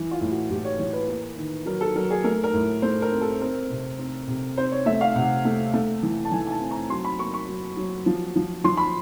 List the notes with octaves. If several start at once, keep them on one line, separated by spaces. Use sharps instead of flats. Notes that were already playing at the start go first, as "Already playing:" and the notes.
Already playing: E3
F4
A2
F#4
A2 G4
C#5
E3 C#5
B4
A#3
D#3
F#3 A#4
A4
F#3 A#4
G#4
A3 A#4
A#4
A2
A3 C5
A#4
C4
A4
C4 A#4
C3
C4
C3
C4 C5
C#5
A3 E5
F5
C3 F#5
A3
A3
E3
A5
E3 G#5
G#5
A5
C4
A#5
F#3 C6
B5
A#3 C#6
C#6
F#3
F#3
F3
F3
F3 C6
B5